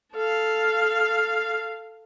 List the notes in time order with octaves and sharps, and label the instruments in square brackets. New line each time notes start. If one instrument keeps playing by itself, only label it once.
[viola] A4 F5